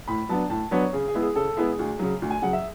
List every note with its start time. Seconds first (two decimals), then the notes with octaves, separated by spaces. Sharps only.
0.08 A2 B5
0.29 F#3 B3 D4 A5
0.50 A2 A5
0.71 F#3 B3 D4 C#5
0.93 C#3 G#4
1.08 G#4
1.14 G#3 B3 E4
1.21 G#4
1.36 C#3 A4
1.57 G#3 B3 E4 G#4
1.79 D2
1.99 C#3 F#3
2.22 D2
2.30 G#5
2.42 C#3 F#3 F#5
2.53 E5